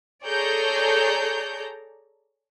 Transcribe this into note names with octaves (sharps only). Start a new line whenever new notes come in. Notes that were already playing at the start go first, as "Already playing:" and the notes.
G#4 A4 C#5 D5 A#5 G6